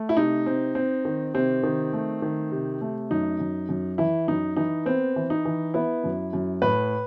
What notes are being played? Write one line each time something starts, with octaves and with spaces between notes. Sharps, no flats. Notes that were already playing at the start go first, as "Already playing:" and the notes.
Already playing: A3
E4
C3 D#4
C4
C4
D#3
C3 C4
D#3
A3
D#3
C3
A3
F#2 D#4
F#2
F#2
E3 E4
F#2 D#4
E3 D#4
B3 C4
E3
D#4
E3
B3 E4
F#2
F#2
A2 B4